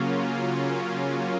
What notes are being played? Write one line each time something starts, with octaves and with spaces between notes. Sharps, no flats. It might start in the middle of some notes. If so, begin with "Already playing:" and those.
Already playing: C#3 F#3 A#3 C#4 F4